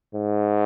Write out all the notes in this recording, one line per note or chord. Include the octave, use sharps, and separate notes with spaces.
G#2